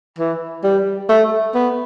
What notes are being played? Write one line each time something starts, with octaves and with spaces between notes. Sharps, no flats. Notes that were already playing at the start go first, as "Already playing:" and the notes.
E3
G3
A3
B3